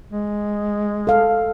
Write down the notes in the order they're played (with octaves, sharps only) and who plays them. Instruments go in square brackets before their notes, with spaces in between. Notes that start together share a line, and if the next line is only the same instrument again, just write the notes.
[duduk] G#3
[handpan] A4 F5